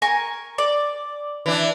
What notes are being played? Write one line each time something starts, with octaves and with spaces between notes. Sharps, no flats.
A#4 G#5 C#6
D5
E3 D4